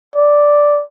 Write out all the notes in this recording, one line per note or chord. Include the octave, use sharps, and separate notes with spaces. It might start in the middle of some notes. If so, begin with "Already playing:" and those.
D5